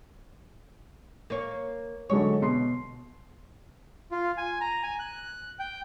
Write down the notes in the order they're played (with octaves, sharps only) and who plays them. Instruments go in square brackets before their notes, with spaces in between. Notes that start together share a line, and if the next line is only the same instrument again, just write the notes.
[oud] A#3 C#5
[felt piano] D3 F#3 G#3 [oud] C#5
[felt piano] B2 C6 C7
[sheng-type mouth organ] F4
G#5
A#5
G#5
F#6
G5